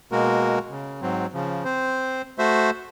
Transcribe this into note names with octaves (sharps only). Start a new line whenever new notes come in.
B2 G#3 A#3 F#4 A#4
C#3
G#2 F#3 C4
C#3 F3
C4 C5
A3 F#4 C5 E5